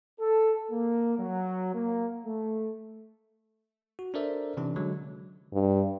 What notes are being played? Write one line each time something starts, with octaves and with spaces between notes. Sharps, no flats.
A4
A#3
F#3
A#3
A3
F#4
D4 A4 A#4 C5 D5 E5
C3 E3 C#4 D4
D3 F#3 G#3
G2